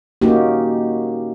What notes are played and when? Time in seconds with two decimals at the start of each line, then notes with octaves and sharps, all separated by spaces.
0.22 A#3 C#4 D#4 F#4 G4